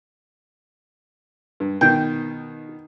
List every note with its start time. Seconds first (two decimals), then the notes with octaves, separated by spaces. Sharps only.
1.60 G2
1.81 B2 D#3 G5